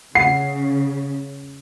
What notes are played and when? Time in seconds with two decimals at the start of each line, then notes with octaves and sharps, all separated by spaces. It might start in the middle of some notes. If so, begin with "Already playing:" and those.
0.15 C#3 F#5 C7